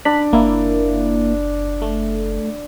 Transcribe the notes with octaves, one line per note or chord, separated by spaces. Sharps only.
D4 B5
F#1 A#3 E4
A3